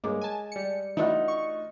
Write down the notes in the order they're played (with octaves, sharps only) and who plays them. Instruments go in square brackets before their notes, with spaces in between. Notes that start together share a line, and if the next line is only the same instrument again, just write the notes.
[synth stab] G2 A#3 [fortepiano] G#3 C#5 D6
[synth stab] G#5 A5
[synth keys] G3 C#7
[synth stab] E3 A3 D4 [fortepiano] D#4 F4 F#4
[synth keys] C#6